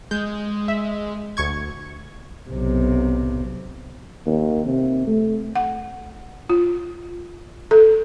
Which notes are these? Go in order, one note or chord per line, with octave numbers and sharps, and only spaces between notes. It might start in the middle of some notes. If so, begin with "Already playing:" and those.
G#3 G6
E5
D2 C#6 G#6
B1 C3
D#2
C3
A3
F#5
F4
A4